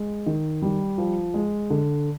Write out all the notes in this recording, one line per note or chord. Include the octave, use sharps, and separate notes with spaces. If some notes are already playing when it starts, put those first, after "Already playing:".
Already playing: G#3
D#3
G3
F3
G#3
D3